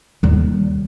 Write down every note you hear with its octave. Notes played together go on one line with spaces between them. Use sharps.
D#2 G3